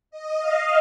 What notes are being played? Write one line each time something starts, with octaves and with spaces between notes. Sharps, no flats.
D#5
F5